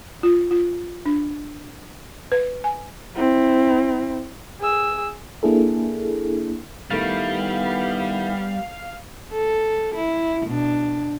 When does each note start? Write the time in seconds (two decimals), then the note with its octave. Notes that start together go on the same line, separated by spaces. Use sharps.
0.23 F4
0.51 F4
1.06 D4
2.32 B4
2.64 G#5
3.16 C4 E4
4.60 G#4 E6
5.43 A#3 D4 E4 G#4 A4
6.91 D#3 G3 A3 B3 E4 F5
9.33 A4
9.94 E4
10.46 B2 D4